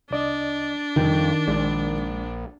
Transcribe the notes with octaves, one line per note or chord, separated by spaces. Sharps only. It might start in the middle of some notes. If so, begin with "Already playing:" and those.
C2 D4 D5 D#5
F2 D#3 F3 G3 G5
A#1 G#3 D5